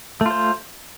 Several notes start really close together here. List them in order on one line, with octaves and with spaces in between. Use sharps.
A3 F4 C5